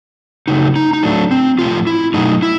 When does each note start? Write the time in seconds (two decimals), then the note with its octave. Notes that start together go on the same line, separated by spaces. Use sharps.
0.48 C#3 F#3 A3 D#4
0.76 D#4
0.93 D#4
1.03 A2 F#3 A3 D4
1.31 C4
1.58 A2 F3 A3 F4
1.87 E4
2.14 B2 F#3 A3 D#4
2.43 E4